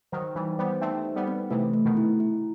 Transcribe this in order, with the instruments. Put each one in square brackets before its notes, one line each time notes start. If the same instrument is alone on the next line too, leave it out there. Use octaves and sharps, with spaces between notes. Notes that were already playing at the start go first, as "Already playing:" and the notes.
[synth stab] D#3 F#3 [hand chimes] C5
[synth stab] E3 G3 [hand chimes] D#4
[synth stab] G3 B3 [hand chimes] C5
[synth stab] A3 C4 [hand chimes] D#4
[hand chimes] D#4
[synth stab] G3 B3
[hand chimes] C4
[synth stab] C3 E3 [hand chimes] A3
[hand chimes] A3
[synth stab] B2 D#3
[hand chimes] E4
E4